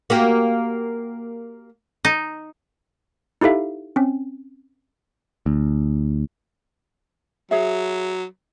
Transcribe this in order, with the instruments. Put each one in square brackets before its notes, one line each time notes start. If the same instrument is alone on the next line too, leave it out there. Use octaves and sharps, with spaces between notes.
[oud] A#3 F#4 G4
[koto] D#4
[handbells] D#4 E4 G4 A4 E5 F5
C4 C#4
[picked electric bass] D2
[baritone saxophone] F#3 [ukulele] G#4 C#5 E5